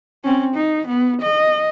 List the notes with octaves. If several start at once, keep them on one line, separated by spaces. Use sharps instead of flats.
C4 C#4
D#4
B3
D#5